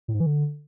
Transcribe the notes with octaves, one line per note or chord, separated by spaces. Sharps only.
A2
G#2
E3
D3